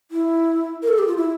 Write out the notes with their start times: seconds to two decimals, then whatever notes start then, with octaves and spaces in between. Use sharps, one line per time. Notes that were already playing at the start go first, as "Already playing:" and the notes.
0.11 E4
0.83 A#4
0.88 A4
0.98 G4
1.07 F4
1.17 E4